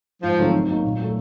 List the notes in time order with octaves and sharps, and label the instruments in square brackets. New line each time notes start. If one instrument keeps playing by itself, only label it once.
[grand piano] G#2 [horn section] F3
[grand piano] D#3 F#3 A3 C4
D#3
F#3 A#3 D#4
A#2
F#3 A3